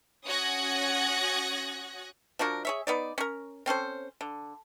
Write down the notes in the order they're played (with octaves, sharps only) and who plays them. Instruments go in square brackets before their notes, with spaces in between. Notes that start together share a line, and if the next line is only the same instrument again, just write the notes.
[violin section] C#4 F#4 D#6 F#6 G#6 A#6
[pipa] F3 D4 F#4 A#4
G#4 C#5 E5
B3 D#4 D5
C#4 A#4
C4 C#4 A4 C5
D3